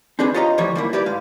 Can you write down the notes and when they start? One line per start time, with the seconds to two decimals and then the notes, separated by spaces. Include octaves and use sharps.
0.19 C4 D4 G#4 B4
0.34 F4 G4 C#5 D#5 F5 A#5
0.58 D2 E3 F3 G3 C#5
0.75 G3 A#3 E4
0.93 E4 G4 B4 D5
1.06 G#2 G#3 F5